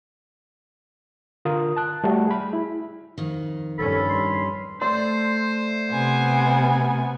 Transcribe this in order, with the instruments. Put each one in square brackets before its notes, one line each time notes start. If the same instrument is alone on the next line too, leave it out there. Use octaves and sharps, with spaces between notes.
[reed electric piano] D3 F4 A#4 D#6
A5 F#6
G3 A3 F#4 A4
G#4 B5
E4
[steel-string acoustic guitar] F2 D#3
[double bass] G2 C#4 [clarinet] A4 [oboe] B5
[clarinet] C6
[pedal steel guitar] A3 D5 E6 [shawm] C5 [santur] C6
[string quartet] C3 B3 G#5